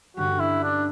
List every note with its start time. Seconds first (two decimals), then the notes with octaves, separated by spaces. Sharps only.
0.17 G2 D3 G3 C#4 F#4 G4
0.40 E4
0.63 D4